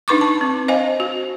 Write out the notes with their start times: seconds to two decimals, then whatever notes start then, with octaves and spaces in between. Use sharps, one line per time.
0.08 D4 D#4 B4 B5 C#6 D6
0.21 A5
0.41 C4
0.68 C5 D#5 F5 G#5
1.00 F#4